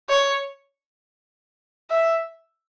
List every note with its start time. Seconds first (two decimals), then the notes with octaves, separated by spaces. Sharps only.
0.09 C#5
1.90 E5